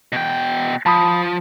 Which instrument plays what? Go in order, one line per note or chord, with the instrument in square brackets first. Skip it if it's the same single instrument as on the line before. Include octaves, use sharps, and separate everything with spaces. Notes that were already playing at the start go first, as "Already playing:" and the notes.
[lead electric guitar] B2 G5
[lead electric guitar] F3 [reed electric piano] A5 B5 D#6